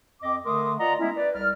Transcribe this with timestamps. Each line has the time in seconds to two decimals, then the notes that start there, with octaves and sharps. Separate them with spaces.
0.22 F2 C4 D#5 D6
0.45 D3 A3 A#4 C6 D6 D#6
0.79 F4 D5 D#5 F#5 A#5
1.00 G#3 B3 C#4 E4
1.15 B4 D5
1.35 C2 G3 D5 F6